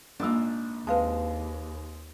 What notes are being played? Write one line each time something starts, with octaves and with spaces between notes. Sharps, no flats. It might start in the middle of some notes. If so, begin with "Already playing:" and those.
A#1 G#2 A#3 D4 E6
D#2 G#3 C4 B4 F5 A5